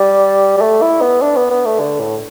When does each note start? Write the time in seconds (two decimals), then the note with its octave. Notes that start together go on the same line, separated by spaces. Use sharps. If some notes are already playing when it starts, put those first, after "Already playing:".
Already playing: G3
0.57 G3
0.61 A3
0.82 E4
1.02 B3
1.22 D4
1.36 B3
1.50 B3
1.65 A3
1.80 D3
2.00 A2